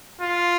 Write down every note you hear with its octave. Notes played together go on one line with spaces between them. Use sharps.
F4